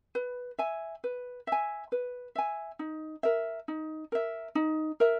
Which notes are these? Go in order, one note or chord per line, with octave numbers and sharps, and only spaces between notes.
B4
E5 G#5
B4
E5 G#5
B4
E5 G#5
D#4
A#4 E5
D#4
A#4 E5
D#4
A#4 E5